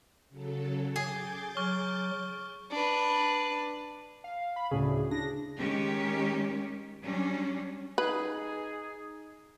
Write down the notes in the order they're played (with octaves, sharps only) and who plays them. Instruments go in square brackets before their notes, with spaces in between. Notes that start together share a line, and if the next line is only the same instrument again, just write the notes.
[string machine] C#3 F#3 A4
[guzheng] G#4 [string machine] D6 G6 A6
[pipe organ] F#3 [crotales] C#6 F6 G7
[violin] D4 B4
[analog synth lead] F5
B5
[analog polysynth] D2 A2 C#3 [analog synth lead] G#4
[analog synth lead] D4 [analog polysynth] A#6
[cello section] D#3 G#3 C#4 G4
F#3 G3 C#4 D4
[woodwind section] D#4 G#4 [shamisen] B4